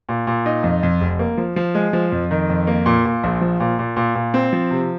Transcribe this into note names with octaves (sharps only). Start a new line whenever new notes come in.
A#2
A#2
D#4
F2
F2
F1
A#3
F3
F3
G#3
F3
F2
D#3
F2
A#3
A#2
A#2
A#1
F3
A#2
A#2
A#2
A#2
C4
F3
C3